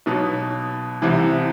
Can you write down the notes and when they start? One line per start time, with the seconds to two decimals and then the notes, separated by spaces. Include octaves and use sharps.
0.06 B1 B2 F#3 B3
1.02 C2 C3 E3